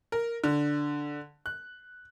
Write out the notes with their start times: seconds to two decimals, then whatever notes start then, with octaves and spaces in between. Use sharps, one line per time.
0.12 A#4
0.44 D3
1.46 F#6